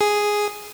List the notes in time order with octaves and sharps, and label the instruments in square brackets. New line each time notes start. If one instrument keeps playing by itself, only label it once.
[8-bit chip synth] G#4